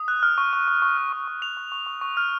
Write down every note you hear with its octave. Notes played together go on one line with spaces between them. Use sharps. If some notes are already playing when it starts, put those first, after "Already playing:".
Already playing: D#6
F#6
F6
C#6
C#6
C#6
C#6
F6
C#6
C#6
C#6 F7
C#6
C#6
C#6
C#6
F6